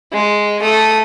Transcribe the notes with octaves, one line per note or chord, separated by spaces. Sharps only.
G#3
A3 D#6